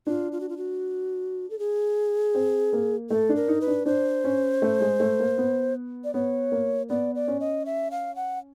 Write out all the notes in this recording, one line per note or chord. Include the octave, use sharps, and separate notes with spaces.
D4 F4
F4
F#4
F4
F#4
A4
G#4
C4
A#3
A3 A4
D4
A#4
D#4
B4
D4
D4 C5
C#4
A3
G#3
A3
A#3
B3
D5
B3 C#5
A#3
B3 D5
D5
C#4
D#5
E5
F5
F#5